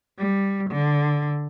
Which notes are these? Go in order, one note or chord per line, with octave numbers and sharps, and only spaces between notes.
G3
D3